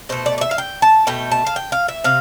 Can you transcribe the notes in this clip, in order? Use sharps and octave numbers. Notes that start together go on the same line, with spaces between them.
B2 A3 C5
D5
D5
E5
F5
G5
A5
B2 A3 G5
A5
F5
G5
F5
E5
C3 F5